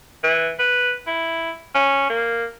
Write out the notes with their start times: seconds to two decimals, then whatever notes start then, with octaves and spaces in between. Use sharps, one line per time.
0.24 E3
0.59 B4
1.07 E4
1.75 C#4
2.10 A#3